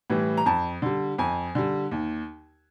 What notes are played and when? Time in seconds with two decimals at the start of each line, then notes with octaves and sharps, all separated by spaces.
0.10 A2 E3 G3
0.37 A#5
0.46 F2 A5
0.82 D3 G3
1.18 F2 G#5
1.55 D3 G3
1.91 D#2